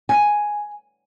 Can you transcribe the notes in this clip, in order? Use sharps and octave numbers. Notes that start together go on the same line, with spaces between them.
G#5